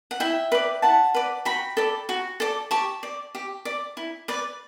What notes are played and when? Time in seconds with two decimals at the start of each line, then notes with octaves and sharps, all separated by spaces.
0.11 F#5
0.20 E4 E5 G5
0.52 B4 D5
0.82 E4 F#5 A5
1.14 B4 D5
1.45 F#4 G5 B5
1.77 A4 D5
2.09 F#4
2.40 A4 D5
2.71 G4 A5 C#6
3.03 D5
3.35 G4
3.65 D5
3.97 E4
4.28 B4 D5